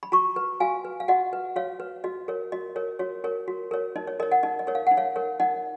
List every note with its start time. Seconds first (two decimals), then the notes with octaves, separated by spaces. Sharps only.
0.03 B5
0.12 F#4 A#5 C#6
0.36 B4
0.60 F#4 F5 G#5
0.85 B4
1.00 F5
1.08 F#4 D#5 F#5
1.33 B4
1.56 F#4 C#5 F5
1.80 B4
2.04 F#4 D#5
2.28 A#4 C#5
2.52 F#4 D#5
2.76 A#4 C#5
2.99 F#4 C#5
3.24 A#4 C#5
3.48 F#4
3.71 A#4 C#5
3.96 D#4 D#5
4.07 C#5
4.20 A#4 C#5 D#5
4.31 D#5 F#5
4.43 D#4 D#5
4.59 D#5
4.67 A#4 C#5
4.75 F5
4.87 D#4 F#5
4.97 C#5 F5
5.16 A#4 C#5
5.40 D#4 D#5 F#5